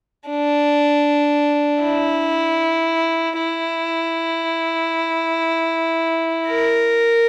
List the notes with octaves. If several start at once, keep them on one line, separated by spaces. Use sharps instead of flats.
D4
E4
E4
A#4